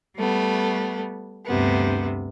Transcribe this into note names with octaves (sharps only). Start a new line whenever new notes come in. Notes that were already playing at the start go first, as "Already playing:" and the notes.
G3 A3 B3
D2 G2 C3 B3